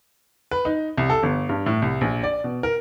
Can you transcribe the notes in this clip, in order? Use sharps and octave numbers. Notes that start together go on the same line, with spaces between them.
B4
D#4
C2
A4
G1
G2
A2
C2
A#1
D5
B2
A#4